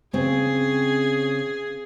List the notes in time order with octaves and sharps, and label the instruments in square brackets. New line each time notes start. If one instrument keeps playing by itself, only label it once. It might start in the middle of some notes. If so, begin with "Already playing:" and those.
[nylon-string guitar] C#3 C4 [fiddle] G#4